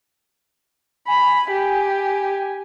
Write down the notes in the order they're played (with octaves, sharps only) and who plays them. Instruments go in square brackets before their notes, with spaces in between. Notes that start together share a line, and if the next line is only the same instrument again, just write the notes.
[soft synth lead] G#5 [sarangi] B5
[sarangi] G4